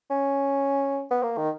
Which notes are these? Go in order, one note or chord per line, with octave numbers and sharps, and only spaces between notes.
C#4
B3
A#3
D#3